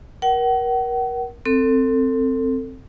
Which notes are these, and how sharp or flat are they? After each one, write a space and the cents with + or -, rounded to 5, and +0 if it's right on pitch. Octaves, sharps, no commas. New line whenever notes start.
A#4 +30 F#5 +40
C4 +0 A4 +25